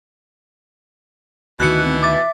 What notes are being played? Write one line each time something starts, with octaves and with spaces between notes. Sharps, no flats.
D2 B2 D#3 E3 F#4 F#6 C#7
C4
E5 D6 A6